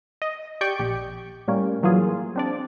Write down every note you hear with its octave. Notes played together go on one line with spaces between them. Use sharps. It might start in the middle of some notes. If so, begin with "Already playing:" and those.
D#5
G4 D5 G5 C#6 G6
A#1 G4
A2 G3 A#3 C#4
E3 F#3 A#3 F4 G#4
C4 D4 D5